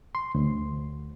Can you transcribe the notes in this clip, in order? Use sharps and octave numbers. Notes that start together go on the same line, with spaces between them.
C6
D2